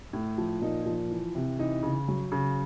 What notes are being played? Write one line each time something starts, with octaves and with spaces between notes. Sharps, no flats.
A2
F3
A#2 D#4
F3
E3
C3
E3 D#4
C#3
F#3
C#3